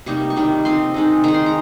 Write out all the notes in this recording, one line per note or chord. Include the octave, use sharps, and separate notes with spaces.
C3 G3 A#3 D#4 C#6
C#6
C3 D#3 G3
F3 C4 D#4 C6
D#3 G#3 D#4
D#3 G#3 D#4 A#5
C6
A#5